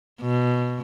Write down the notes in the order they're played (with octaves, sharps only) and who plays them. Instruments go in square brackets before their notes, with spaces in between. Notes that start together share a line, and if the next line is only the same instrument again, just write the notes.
[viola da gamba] B2